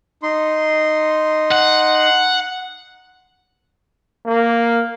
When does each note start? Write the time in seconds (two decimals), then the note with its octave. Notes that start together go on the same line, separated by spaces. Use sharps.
0.23 D#4 C6
1.52 F#5
4.26 A#3